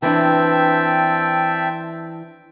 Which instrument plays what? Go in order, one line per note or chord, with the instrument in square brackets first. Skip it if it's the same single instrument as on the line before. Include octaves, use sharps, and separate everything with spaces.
[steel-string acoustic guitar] E3 D4 [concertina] C4 E5 [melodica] G5 A5